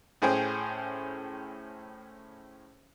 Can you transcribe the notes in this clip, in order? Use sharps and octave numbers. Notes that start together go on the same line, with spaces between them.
A2 C#4 G#4 C5 G5